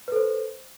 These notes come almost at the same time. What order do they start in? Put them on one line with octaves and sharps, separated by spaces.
B4 A4 C5